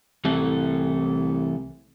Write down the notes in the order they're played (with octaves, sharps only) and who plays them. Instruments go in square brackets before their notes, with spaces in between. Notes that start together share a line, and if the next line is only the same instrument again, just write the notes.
[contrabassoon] C2 [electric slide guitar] E3 A3 A4